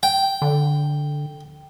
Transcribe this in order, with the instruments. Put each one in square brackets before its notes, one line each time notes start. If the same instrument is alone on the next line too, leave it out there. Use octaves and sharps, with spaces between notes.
[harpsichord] G5
[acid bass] D3